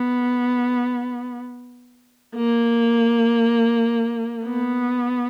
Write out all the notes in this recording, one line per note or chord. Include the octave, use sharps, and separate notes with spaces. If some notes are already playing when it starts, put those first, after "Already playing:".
Already playing: B3
A#3
B3